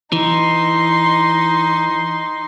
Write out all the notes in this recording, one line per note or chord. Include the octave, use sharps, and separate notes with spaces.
E3 D#4 C6